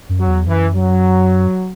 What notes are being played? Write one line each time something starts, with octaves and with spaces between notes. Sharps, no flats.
F#2
F#3
E2
F#2 E3
F#3